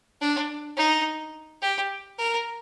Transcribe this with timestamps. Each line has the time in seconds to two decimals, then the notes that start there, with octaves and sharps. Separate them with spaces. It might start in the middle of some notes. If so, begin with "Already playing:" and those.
0.21 D4
0.77 D#4
1.62 G4
2.18 A#4